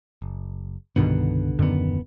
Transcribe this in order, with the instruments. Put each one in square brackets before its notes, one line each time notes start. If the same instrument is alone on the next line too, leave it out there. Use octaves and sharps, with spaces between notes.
[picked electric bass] F#1
[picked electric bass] C2 D3 B3 [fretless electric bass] G2 B2 D#3
[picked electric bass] D#1 B3 [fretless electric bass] F#2 D3 D#3